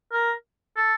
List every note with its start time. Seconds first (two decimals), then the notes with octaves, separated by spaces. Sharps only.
0.13 A#4
0.76 A4